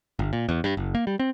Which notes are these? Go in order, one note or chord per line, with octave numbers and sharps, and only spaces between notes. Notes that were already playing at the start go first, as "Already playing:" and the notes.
G1
A#2
E2
G2
F#1
A#3
G3
C4